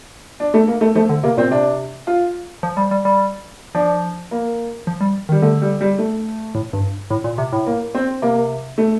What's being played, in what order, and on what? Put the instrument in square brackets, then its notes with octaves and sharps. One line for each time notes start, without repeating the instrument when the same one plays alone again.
[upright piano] D4
A3
A#3
A3
[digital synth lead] F3 [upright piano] A3
[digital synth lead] D3
[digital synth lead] C3 [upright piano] A#3
[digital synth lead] A#2 [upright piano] C4
[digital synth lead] C3 [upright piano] D4
[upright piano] F4
[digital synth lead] F3
G3
G3
G3
[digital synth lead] F3 [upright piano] D4
[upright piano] A#3
[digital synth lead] F3
G3
D#3
[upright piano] G3
[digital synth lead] D3 [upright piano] A3
[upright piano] G3
G3
A3
[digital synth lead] A2
G2
A2
A#2
C3
A2
[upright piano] A#3
C4
[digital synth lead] C3 [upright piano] A#3
[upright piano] A3